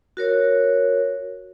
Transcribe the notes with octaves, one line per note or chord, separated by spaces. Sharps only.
F#4 A#4 C#5